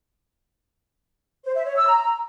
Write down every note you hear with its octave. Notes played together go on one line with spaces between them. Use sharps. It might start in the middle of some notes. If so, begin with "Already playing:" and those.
C5
E5
C#5
E6
A#5